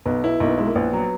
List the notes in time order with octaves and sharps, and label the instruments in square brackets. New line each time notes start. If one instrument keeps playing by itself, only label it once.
[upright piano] B1 [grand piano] B3
[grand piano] B3 [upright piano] E4
[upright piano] B1 [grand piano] A#3
[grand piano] B3
[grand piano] G#3 [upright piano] E4
[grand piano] A#3
[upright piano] A#1 [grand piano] B3
[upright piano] F#3